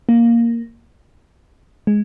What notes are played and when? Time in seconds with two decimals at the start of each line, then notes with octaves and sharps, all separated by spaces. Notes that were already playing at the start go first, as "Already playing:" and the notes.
0.09 A#3
1.87 G#3